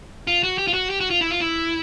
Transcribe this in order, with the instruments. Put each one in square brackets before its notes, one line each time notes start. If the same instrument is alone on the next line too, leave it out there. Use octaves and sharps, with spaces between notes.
[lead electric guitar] F4
F#4
G4
F4
F#4
G4
F#4
F4
E4
F4
E4